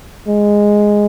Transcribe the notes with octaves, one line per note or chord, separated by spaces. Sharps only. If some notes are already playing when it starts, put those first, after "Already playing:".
G#3